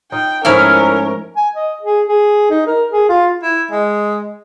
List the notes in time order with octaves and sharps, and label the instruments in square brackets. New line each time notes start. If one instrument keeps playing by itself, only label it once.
[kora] D#4 F4 [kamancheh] G5
[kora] G#2 F3 A3 [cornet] C#4 [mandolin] E4 F6 [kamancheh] A#4
[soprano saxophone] G#5
D#5
G#4
G#4
D#4
A#4
G#4
F4
[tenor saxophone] E4
G#3